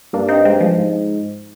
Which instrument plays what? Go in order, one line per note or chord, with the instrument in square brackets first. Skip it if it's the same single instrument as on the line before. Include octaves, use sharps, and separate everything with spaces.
[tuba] G2 [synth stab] A#3 D4
[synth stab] C4 D#4
G#3 C4
F3 G#3
[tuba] G#2